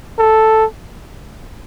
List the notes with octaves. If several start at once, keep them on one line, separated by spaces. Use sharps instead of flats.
A4